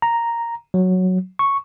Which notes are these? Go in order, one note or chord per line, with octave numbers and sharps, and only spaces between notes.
A#5
F#3
C#6